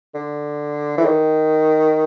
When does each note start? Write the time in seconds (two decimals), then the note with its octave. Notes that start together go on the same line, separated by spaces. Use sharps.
0.15 D3
0.97 E3
1.05 D#3